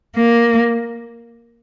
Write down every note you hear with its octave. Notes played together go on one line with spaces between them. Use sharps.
A#3